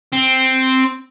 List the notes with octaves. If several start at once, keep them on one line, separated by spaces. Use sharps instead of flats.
C4